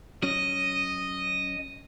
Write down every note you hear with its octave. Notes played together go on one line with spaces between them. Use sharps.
F#3 C#4 D#5